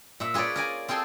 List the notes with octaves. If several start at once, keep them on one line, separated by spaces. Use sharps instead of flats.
A#2 E5
F4 G#4 B4 C#5 D5
A#4 D5 G#5
C4 F4 G#4 A4 C5